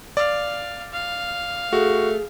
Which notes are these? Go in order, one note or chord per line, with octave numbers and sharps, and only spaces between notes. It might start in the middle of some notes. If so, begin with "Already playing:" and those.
D5 F5
F5
A3 F#4 G#4